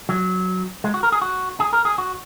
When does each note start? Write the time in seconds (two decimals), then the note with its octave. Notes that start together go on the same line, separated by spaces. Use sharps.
0.09 F#3
0.84 G#3
0.94 F#4
1.03 A#4
1.12 G#4
1.21 F#4
1.60 G#4
1.73 A#4
1.85 G#4
1.98 F#4